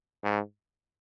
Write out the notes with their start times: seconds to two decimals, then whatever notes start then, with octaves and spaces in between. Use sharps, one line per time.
0.24 G#2